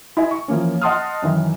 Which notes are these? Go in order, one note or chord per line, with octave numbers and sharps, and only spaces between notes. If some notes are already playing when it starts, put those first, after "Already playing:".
E4 D#5 G#5
C#6
E3 F3 A#3 C#4
D#5 F#5 A5 C6 D#6 F6
F#2 D#3 E3